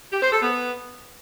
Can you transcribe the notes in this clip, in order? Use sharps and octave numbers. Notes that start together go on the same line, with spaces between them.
G4
C5
A4
B3